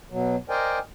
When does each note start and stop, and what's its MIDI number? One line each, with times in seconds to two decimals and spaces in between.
0.11 0.36 47
0.11 0.36 54
0.50 0.79 70
0.50 0.79 72
0.50 0.79 74
0.50 0.79 75
0.50 0.79 79
0.50 0.79 80